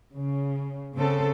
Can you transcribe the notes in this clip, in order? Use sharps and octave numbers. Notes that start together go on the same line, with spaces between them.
C#3
C#3 C4 A4